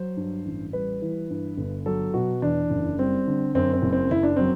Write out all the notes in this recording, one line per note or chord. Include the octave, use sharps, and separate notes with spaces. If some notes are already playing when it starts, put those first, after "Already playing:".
Already playing: F#3 C5
G2
A1
G3 B4
E3
G2
G1
F#3 A4
B2 F#4
E2 D4
F#1
G3 C4
D3
F#2 C4
C4
F#1
C4
F#1 E4
D4
F#3 C4